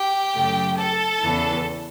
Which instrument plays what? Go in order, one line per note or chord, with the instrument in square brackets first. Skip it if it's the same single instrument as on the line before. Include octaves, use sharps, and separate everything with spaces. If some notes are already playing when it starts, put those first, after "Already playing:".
Already playing: [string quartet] G4 G5
F#2 C#3 F#3 A3
A4 A5
E2 C#3 E3